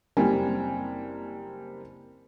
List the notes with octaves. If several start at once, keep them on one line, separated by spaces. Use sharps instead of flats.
F#1 G3 A#3 C4 G#5